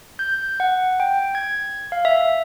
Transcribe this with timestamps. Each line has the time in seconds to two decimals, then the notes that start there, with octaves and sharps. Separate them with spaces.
0.19 G6
0.60 F#5
1.00 G5
1.35 G#6
1.92 F5
2.05 E5